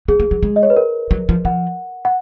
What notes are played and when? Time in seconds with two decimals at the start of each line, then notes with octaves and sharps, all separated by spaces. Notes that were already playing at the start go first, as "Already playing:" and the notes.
0.08 B3 G#4
0.20 A#3
0.31 F#3
0.43 G#3
0.56 D#5
0.63 C#5
0.70 B4
0.77 A#4
1.11 F#3
1.29 F3
1.45 F3 F#5
2.05 F#5